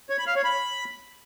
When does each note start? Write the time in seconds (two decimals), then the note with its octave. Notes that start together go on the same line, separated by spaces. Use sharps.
0.10 C#5
0.18 B5
0.27 F5
0.36 C#5
0.44 B5